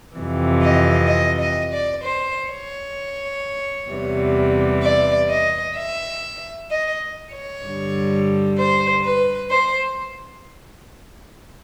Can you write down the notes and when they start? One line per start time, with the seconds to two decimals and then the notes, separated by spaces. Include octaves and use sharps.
0.16 F2 C3 E3
0.63 D#5
1.09 D#5
1.40 D#5
1.72 D5
2.02 C5
2.50 C#5
3.90 E2 C3 E3 G3
4.83 D5
5.30 D#5
5.76 E5
6.70 D#5
7.32 C#5
7.64 G2 D3 G3
8.57 C5
9.04 B4
9.50 C5